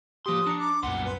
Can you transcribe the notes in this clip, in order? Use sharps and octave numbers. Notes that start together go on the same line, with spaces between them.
F3 A#3 G4 C6 D#6
D4 A#5 C#7
D6
C2 F#2 A#2 B3 F#5 C6
B4